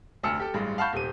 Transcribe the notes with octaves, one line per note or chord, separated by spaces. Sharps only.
F1 D2 A5 E6 F6 C#7
G4 A4
A1 G2 G#3
F5 F#5 A5 B5 C#6 G6
D#1 C3 D#7